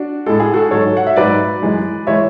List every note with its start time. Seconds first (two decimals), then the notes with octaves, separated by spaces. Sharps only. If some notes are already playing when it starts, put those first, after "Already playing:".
Already playing: D4 F#4
0.26 A2 G#3 A4
0.40 G#4
0.54 F#4 A4
0.71 G#2 F#3 A4 C#5
0.97 F#5
1.07 E5
1.16 G#2 F#3 B4 D5
1.62 F#2 E3 G#3
2.07 E3 G#3 C#5 E5